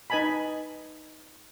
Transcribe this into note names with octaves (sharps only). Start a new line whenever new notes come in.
D#4 B4 D#5 G#5 A5 B5